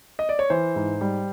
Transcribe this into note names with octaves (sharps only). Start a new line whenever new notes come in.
D#5
D5
C#5
E3 C5
G#2
G3